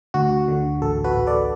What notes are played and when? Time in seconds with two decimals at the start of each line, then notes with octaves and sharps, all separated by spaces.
0.14 D2 F#4
0.48 D3
0.82 A1 A4
1.04 F#4 B4
1.16 A1
1.27 A4 D5